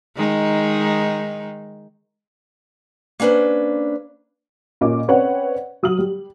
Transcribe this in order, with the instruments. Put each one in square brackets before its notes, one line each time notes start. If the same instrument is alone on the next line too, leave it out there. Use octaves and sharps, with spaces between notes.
[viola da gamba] D#3 G#3 D#4
[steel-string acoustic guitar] A#3 C#4 D4 B4 C5
[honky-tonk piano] A#2 C#4 D#5 D6
C4 C#4 B4 C#5 D5 F#5
F#3 D#6 F6 F#7
G3